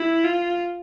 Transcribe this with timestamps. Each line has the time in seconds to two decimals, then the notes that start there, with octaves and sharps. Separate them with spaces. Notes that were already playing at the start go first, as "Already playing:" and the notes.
Already playing: E4
0.24 F4